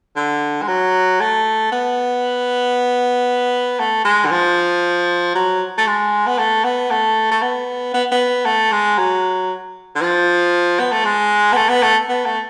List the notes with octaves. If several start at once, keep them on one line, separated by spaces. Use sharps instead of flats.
D3
G#3
F#3
A3
B3
A3
G#3
D3
F3
F#3
A3
G#3
B3
A3
B3
A3
A3
B3
B3
B3
A3
G#3
F#3
D3
F3
B3
A3
G#3
B3
A3
B3
A3
B3
A3